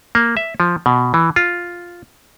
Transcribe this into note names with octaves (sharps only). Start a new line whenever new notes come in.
A#3
E5
F3
B2
E3
F4